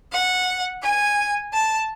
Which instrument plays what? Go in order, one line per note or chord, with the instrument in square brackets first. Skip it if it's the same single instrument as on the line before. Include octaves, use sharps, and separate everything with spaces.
[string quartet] F#5
G#5
A5